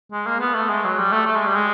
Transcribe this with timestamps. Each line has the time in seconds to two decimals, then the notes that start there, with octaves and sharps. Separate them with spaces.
0.12 G#3
0.26 A#3
0.40 B3
0.54 A3
0.69 G#3
0.84 F#3
0.98 G3
1.12 A3
1.26 A3
1.36 G#3
1.46 G3
1.55 G#3